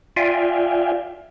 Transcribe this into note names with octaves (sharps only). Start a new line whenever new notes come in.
F4 D5 E5 F5 G5 G#5